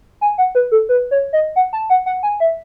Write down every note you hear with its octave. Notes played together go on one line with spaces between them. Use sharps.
G#5
F#5
B4
A4
B4
C#5
D#5
F#5
A5
F#5
F#5
G#5
E5